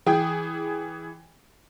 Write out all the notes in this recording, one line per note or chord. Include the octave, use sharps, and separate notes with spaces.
E3 G#4 G5